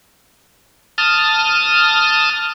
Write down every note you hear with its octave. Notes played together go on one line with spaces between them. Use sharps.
A5 D#6 F6